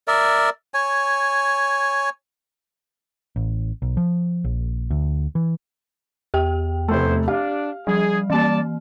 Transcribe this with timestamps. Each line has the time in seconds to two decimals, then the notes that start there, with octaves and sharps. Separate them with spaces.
0.08 A#4 D5 E5
0.74 C#5 G#5
3.36 A1
3.82 B1
3.97 F3
4.44 A#1
4.91 D2
5.35 E3
6.34 E2 G4 G5
6.88 F1 A3 B3 E4 C5
7.28 D4 G4 F5
7.87 F3 G3 G#4
8.30 E3 A#3 D5 A5